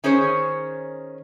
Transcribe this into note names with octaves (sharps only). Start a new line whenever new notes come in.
D#3 C#4 G#4 C5 C#5